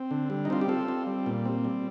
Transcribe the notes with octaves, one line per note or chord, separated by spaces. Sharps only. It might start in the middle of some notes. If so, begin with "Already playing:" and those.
Already playing: C4
D3
G3
D#4
C4 F4
G4
C4 F4 A4
C4
G3
A#2
C4
G3